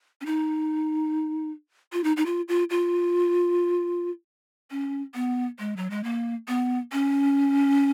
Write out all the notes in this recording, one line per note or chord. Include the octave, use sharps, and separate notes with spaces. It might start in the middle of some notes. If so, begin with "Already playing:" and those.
C#4
D#4
F4
D#4
D#4
F4
F4
F4
C#4
B3
G#3
F#3
G#3
A#3
B3
C#4